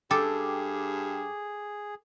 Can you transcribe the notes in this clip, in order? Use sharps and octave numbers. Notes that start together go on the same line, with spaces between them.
G2 G#4 A4 G5 D6